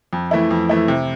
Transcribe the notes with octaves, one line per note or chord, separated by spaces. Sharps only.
F2
E3 A3 E4
F2
E3 A3 E4
C3